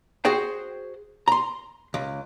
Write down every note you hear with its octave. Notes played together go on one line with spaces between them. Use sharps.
F#4 G#4 C5 G5
A#5 C6
C#2